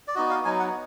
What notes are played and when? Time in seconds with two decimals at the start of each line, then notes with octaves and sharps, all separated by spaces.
0.08 D5
0.15 B3 D#4 F#4 D#5
0.30 F5
0.45 F#3 B3 D#4 G#5
0.60 F#5